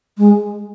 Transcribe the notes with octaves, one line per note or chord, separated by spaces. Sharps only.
G#3